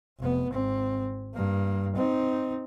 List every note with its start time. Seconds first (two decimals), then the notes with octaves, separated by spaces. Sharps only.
0.20 F1 B3
0.51 G#1 C4
1.34 G2 A#3
1.95 C4 D#4